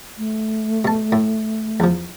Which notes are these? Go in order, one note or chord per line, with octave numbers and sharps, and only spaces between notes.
A3
B2 A5
A2
E2 F3